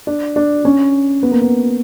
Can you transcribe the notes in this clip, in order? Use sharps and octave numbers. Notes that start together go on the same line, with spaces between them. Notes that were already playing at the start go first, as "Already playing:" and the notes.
D4
D4
C#4
B3
A#3
B3